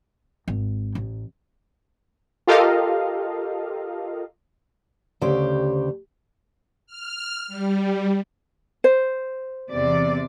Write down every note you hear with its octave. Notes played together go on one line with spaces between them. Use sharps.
G#1
A1
F4 G4 A4 A#4 D#5 F5
D2 C#3 G4 C5 G5
F6
G3
C5
E2 C3 D5